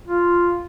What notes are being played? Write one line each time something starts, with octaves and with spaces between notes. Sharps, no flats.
F4